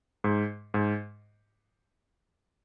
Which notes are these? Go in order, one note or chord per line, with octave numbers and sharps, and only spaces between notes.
G#2
G#2